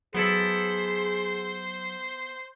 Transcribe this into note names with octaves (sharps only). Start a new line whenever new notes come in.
F#3 B3 E4 G#4 A4 C5